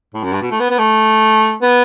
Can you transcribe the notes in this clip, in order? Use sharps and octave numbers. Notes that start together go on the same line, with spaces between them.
A2
F#2
G2
B2
A3
B3
B3
A3
B3